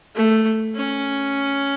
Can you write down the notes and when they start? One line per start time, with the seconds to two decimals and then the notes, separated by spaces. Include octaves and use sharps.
0.15 A3
0.75 C#4